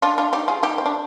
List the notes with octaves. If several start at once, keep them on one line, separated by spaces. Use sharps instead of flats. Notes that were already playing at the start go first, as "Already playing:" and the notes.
D4 F4
D4 F4
D#4 G4
F4 G#4
D#4 G4
C4
D4